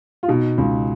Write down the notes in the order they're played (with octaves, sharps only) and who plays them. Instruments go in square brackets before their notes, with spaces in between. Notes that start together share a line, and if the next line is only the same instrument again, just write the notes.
[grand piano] F4
B2 D#4
C#2